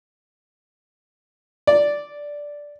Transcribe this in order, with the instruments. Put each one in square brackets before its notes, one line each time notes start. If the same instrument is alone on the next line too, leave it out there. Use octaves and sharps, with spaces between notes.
[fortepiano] D5